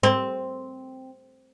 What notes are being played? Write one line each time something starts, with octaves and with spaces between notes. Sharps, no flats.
C4